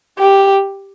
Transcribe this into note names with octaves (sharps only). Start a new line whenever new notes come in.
G4